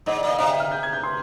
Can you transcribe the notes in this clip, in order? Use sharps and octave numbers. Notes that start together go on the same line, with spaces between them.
G#2 D#5
D5
A#2
D#5
C3 F5
G5
F6
G6
G#6
G6
C6